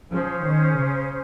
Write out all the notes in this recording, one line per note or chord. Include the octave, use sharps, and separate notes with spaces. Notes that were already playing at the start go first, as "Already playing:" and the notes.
F3 C#4 G#4 C5
D#3
C#3